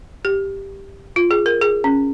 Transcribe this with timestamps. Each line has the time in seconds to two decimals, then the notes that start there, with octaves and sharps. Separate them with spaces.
0.25 G4
1.16 F4
1.31 G#4
1.46 A#4
1.61 G#4
1.84 C#4